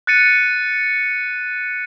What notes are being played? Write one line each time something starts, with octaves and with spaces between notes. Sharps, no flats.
F#6 A6 C#7 D#7